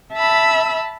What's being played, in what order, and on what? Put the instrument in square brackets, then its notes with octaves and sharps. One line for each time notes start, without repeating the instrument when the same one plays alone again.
[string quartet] E5 A5 B5 E6